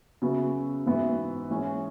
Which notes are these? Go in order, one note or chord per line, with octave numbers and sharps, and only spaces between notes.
C#3 F#3 B3 F#4 E5
G#2 E3 B3 F#4 E5
E3 G#3 C#4 E4